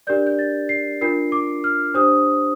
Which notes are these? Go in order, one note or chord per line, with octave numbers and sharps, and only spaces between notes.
D4 G4 A#4 D5 G6
G6
A6
C7
D4 F4 A#4 C7
D6
F6
D4 G4 C5 D#6